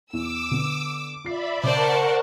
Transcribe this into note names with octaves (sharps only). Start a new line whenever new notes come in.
E2 D6 E6
D3 B3
F4 D5 E5 B5 C7
C#3 A#4 C5 D5 F#5 A5 C#6 D6